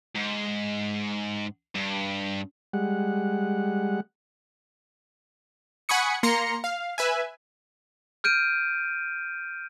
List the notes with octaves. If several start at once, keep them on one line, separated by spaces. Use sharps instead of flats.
G#2
G2
G3 G#3 F#5
F#5 G#5 B5 C#6 D#6 C#7
A#3 A#5 C6 A#6 C#7
F5
B4 E5 G#5
F6 G6 D7 D#7